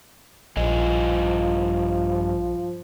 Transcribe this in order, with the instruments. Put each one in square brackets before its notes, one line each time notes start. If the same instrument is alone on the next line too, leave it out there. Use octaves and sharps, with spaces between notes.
[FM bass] A#1 [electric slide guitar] G2 D#5 G#5 [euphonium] F3